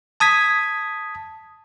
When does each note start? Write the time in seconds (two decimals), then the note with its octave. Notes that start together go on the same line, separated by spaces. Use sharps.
0.20 A5 D#6 G#6 B6